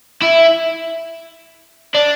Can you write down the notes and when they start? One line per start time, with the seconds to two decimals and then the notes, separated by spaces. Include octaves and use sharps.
0.22 E4
1.94 D4